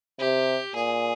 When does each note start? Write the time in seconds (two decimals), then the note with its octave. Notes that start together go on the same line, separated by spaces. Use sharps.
0.19 C3 G4
0.75 A#2 G#4